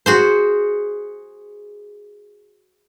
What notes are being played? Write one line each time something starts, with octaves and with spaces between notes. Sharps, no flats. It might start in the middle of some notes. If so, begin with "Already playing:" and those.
F#4 G#4 C5